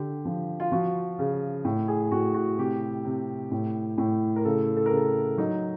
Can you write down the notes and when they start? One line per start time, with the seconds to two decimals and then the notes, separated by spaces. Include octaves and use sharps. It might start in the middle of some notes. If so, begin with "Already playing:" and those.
Already playing: D3 G4
0.25 F3
0.60 F4
0.72 F3 F#4
1.19 C#3
1.65 A2
1.88 G#4
2.12 A2 F#4
2.34 F#4
2.58 C3 G4
3.05 C3
3.51 A2
3.98 A2
4.36 A#4
4.45 C#3 A4
4.77 A4
4.86 A#4
4.91 C#3
4.97 A4
5.38 F#3 D#4